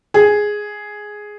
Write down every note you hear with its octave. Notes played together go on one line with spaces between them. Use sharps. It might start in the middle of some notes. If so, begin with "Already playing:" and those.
G#4